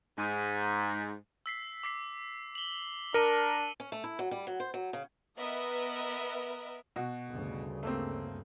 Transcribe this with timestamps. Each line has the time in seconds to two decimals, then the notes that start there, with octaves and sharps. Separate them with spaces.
0.16 G#2
1.46 E6 B6 C7
1.83 D6 B6 C7
2.55 F#7 G7
3.14 D4 A#4 C#7 D#7
3.80 C#4
3.92 A3
4.04 E4
4.19 F#3
4.31 G3
4.47 F#3
4.60 C5
4.74 F#3
4.93 C#3
5.37 B3 A#4 B4 D#5 E5
6.96 B2 F#4
7.30 D2 G2 C#3
7.83 A3 A#3 C4